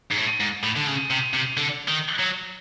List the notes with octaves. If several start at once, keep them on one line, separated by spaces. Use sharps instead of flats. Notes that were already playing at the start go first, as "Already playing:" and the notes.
G#2
A2
G#2
A2
D3
C#3
C3
C3
D3
D#3
F#3